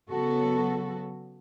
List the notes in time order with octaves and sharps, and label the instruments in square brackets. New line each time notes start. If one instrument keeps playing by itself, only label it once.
[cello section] C#3 F#3 B3 F#4 A4